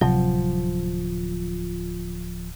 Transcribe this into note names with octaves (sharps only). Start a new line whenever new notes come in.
D1 C3 F3 F#3